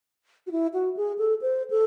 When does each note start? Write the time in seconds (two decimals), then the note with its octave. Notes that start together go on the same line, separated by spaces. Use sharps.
0.47 F#4
0.51 E4
0.74 F#4
0.97 G#4
1.18 A4
1.42 C5
1.70 A4